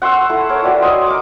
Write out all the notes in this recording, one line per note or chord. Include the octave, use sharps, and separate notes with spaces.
F#5 C6 C#6 E6
E4 A4
A#4 C#5
F#4 B4 D5 G5
C#5 D#5 G#5 C6
A#4 D6